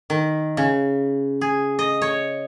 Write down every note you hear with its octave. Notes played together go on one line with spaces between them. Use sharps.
D#3
C#3
G#4
D#5
C#5